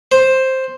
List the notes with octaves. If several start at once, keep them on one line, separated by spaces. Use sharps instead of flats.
C5